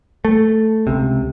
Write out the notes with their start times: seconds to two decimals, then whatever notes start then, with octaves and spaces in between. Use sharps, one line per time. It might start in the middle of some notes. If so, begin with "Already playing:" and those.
0.25 A3
0.87 C#2 C3